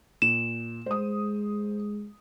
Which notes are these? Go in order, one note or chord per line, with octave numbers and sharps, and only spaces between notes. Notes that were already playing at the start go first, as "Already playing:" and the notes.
A#2 E7
G#3 C5 D#6